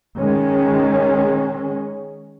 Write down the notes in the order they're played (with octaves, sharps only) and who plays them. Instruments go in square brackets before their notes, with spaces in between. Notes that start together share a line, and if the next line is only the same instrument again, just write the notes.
[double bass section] D#3 G#3 C#4